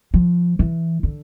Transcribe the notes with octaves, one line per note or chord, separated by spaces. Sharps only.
F3
E3
D3